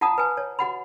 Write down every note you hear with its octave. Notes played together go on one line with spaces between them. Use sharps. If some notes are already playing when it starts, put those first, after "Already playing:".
F4 F#5 A5 A#5 D#6
B4 G#5
C#5
F#4 F#5 B5